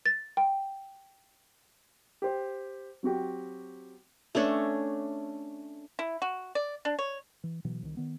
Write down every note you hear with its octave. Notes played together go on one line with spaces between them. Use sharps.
A6
G5
G4 C5
F#3 C4 F#4 G4
A3 C#4 D4 C#5
E4
F#4
D5
D4
C#5
E3
B2 E3 F#3
C2 D#3
D#3 B3